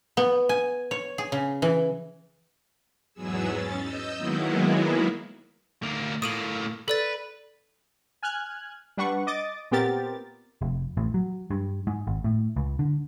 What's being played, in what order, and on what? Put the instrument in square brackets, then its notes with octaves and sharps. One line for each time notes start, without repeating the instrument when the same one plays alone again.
[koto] B3
G#5
C#5
G#4
C#3
E3
[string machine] E2 G#2 F#3 B3 G#4 E6
C#4 A6
D#5 E6 G6
D#3 F#3 G#3 A#3 B3 E4
[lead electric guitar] D2 A#3
[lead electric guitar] A2 A#3 [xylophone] D#6 D#7 F#7
[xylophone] A4 D5 A6 [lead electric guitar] B4
[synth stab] G#5 F6 F#6 G#6
G3 D4 B4 F#5 C#6
D#5 D6 D#6 A6
A#2 B3 C4 G4 A#4 A6
[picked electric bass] F1
A1
F#3
G2
G#2
G#1
A2
C#2
D3